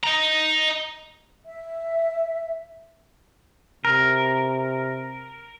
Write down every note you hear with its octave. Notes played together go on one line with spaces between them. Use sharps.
D#5 A#5
E5
C3 A#4